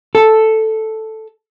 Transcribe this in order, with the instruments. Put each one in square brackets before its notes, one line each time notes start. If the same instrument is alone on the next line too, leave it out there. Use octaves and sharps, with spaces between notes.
[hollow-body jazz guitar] A4